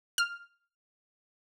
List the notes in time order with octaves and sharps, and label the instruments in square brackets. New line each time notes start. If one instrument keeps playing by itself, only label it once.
[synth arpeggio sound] F6